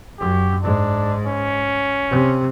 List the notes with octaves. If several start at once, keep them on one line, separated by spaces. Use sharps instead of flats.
F#2 G4
G#2 D4
C#4
C3